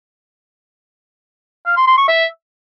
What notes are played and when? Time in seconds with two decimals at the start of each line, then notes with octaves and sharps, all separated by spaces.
1.66 F5
1.76 C6
1.87 C6
1.97 C#6
2.08 E5